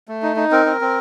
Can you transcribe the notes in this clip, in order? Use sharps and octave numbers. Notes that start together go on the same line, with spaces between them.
A3
D#4
D#4
C4 A#4
C4
C4